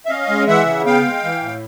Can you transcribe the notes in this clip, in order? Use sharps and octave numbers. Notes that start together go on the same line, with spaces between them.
E5
C#4 D#5 F5
G#3
E3 E5 F#5
C#3
B3 F5 G5
G#3
E3
A2